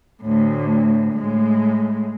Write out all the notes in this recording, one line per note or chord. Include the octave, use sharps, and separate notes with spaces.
D2 A2
A2 G#3